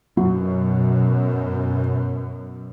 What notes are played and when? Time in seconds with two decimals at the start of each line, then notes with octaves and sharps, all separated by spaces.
0.17 F#2 B2 F#3